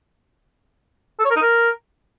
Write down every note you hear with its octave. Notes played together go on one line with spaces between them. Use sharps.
A4
C#5
A#4
D#4
A#4